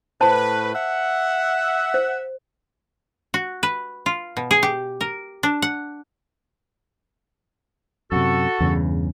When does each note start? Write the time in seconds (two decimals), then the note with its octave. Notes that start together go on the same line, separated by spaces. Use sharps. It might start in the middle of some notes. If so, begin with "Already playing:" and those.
0.21 A2 B4 C5 A5
0.74 E5 F#5
1.94 C5
3.34 F#4
3.63 B4
4.06 F4
4.37 B2
4.51 G#4
4.63 G4
5.01 A#4
5.43 D4
5.62 F#5
8.12 F#2 C3 F#4 A4
8.60 E2 G2 C#3